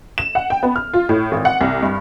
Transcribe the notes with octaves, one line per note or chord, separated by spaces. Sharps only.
E7
F#5
G5
B3
F6
F4
A2
G#1
F#5
C2
G2